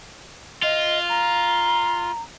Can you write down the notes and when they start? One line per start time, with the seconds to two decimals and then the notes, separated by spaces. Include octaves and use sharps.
0.63 F4 D#5
1.09 A#5